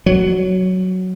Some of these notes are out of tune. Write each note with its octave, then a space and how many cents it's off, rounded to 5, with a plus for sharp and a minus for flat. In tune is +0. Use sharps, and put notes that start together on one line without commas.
F#3 +5